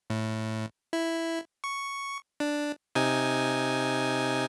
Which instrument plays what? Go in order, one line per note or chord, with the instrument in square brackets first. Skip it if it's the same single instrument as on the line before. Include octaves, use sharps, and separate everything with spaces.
[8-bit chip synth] A2
E4
C#6
D4
C3 D#4 G#5